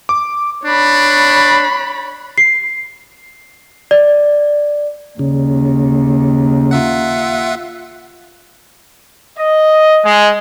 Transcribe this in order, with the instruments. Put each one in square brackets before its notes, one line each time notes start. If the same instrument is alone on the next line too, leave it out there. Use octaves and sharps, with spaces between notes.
[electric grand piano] D6
[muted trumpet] D4 [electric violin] C#5 B5
[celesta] C7
D5
[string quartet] D#2 [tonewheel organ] C#3
[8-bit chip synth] F4 E5 F#5
[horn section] D#5
G#3